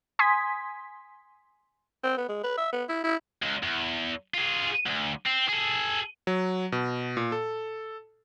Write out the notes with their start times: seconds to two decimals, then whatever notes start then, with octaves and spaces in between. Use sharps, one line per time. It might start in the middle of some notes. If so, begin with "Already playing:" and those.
0.19 G#5 C6 D#6 G#6 B6
2.04 C4
2.17 B3
2.29 G#3
2.44 B4
2.58 E5
2.73 B3
2.89 E4
3.04 E4
3.43 C#2
3.63 E2
4.34 F4 G#4
4.86 D2
5.26 C4
5.49 G#4 A4
6.27 F#3
6.72 B2
7.17 A#2
7.32 A4